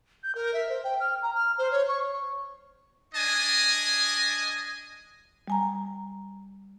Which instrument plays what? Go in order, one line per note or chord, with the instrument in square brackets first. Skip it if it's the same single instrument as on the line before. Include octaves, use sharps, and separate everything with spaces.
[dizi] G6
A#4
E5
C5
G5
F6
A#5
F6
C5
C#5
C#6
[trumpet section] D4 D#5 G#5
[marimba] G3 G#5 A#5